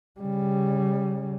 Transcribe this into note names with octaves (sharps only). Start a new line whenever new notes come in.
C#3 G3